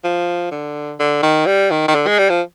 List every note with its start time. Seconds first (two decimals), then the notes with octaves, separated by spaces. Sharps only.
0.04 F3
0.51 D3
1.00 D3
1.23 D#3
1.46 G3
1.71 D#3
1.88 D#3
1.95 D3
2.07 G#3
2.19 G3
2.30 F3